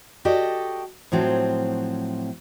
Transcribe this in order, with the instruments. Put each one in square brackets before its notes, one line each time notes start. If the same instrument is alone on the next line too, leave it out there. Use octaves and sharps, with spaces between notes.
[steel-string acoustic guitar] F#4 G4 A4 D5 D#5
A2 F3 F#3 C4